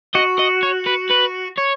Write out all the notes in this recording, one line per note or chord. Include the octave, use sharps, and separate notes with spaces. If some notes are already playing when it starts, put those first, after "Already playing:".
F#4 D#5
D#5
C#5
B4
B4
C#5